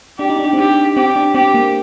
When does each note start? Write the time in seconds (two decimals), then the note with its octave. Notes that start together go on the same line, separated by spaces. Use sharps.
0.19 D4 G4
0.30 D#4
0.39 D4
0.53 C4
0.57 D4 G4
0.97 C4 G4
1.16 D4
1.34 C4 G4
1.54 A#3